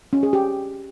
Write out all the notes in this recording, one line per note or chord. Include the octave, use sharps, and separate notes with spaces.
C#4
G#4
G4